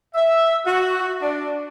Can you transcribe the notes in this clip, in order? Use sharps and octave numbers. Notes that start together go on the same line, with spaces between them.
E5
F#4
D4